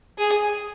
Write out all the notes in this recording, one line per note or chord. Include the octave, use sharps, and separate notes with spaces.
G#4